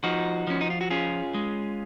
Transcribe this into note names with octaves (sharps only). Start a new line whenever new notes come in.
F3 D#4 F#4
F3 C#4
D#4
F4
F#4
C#4 F4 G#4
G#3